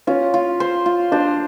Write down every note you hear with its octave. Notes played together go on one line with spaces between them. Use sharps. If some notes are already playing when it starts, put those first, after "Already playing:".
C#4 F4
F4
C5
F4
D4 C5